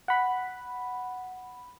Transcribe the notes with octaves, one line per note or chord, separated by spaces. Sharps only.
F#5 B5